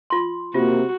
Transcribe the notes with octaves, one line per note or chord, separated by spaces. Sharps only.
F4 C6
C3 A#3 F4 F#4